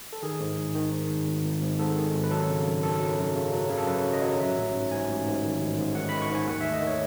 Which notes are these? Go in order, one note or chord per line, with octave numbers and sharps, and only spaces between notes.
A4
D#3 G#4
G#2
G#1
D#3
G#2
G#1
G#1
G#1
G#2
G#2 A4
D#3
G#1
B4
F#3 A4
C#3
F#2
F#2 A4
F#3
F#2
C#3
F#3
C#3
A4
F#2 B4
F#3
D#5
F#3
A1 E5
A1
G#2
G#2 G#5
A1
G#2
D#3
A1
G#2
D#3 F#5
D#3 B5
C#6
G#2 G#5
D#2 F#5
A3 E5
D#5
D#3
C#5